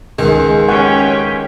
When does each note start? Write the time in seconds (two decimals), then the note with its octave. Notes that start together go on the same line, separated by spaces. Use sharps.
0.19 C#2 D#3 G#3 G#4
0.69 C#4 G4 F#5 G#5 C#6